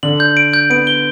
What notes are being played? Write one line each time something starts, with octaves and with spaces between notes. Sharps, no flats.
D3 F#7
G6
D7
G6
B3 D7
G7